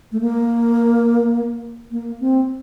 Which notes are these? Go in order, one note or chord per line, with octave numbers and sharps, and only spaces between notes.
A3
A#3
A#3
C4